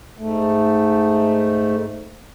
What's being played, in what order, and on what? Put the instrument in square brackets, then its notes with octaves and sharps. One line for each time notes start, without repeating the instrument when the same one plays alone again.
[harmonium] G#2 A3